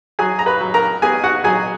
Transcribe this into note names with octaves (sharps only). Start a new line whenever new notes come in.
F#3 G#4 G#5
A#5
B4 B5
F#3
A#4 A#5
B3 G#4 G#5
F#4 F#5
F#3 G#4 G#5